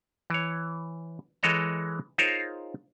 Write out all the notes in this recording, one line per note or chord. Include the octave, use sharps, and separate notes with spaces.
E3 C#5
E3 G#3 A4 C#5 D#5 A#5
D#4 F4 G#4 A#4 C5 C#5